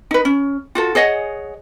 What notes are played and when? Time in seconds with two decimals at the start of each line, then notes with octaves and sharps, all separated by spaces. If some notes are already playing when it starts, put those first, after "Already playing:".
0.11 D#4 B4
0.25 C#4
0.75 F4 F#4 A4
0.95 G#4 C#5 D#5 F#5